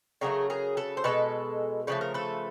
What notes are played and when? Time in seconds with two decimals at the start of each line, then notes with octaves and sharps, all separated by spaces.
0.21 C#3 F#3 A3 G#4 A#4
0.50 G#4 A#4
0.77 A4 B4
0.97 C5
1.04 B2 G#3 A4 B4
1.87 C#3 F3 A3 B4
2.01 A#4
2.14 A4 B4